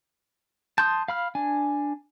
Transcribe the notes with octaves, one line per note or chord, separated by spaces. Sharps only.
A5 C6 D#6 G6
F5 B5 F6
D4 G#5